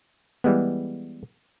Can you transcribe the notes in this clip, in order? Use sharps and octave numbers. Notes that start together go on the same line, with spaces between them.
E3 G3 G#3 B3